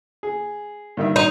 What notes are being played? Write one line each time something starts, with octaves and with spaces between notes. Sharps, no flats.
G#4
G2 D#3 E5
D#4